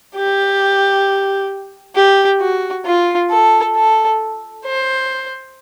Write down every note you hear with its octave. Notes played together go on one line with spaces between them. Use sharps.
G4
G4
F#4
F4
A4
A4
C5